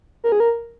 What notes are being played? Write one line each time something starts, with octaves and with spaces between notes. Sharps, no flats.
A#4
G#4
A#4